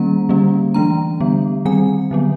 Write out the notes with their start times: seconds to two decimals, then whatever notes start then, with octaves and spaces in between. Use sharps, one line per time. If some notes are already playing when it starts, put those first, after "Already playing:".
Already playing: D#3 G3 A#3 C#4 A#5
0.29 D3 G3 A#3 C#4
0.74 E3 A3 D4 A#5
1.20 D3 G3 B3
1.65 D#3 G3 C4 G#5
2.11 D3 F#3 B3